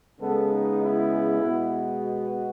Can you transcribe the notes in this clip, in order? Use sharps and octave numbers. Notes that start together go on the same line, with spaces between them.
C#3 G#3 B3 A4
D#4
E4
B2 G#3 B3
F#4